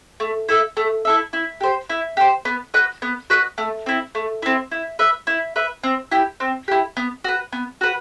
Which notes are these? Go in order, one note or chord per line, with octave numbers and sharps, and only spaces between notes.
A3
E4 A4 E5
A3
E4 A4 E5
E4
G4 C5
E4
G4 C5
B3
F#4 B4 D#5
B3
F#4 B4 D#5
A3
C4 E4
A3
C4 E4
E4
B4 E5
E4
B4 E5
C4
E4 G4
C4
E4 G4
B3
F#4 B4
B3
F#4 B4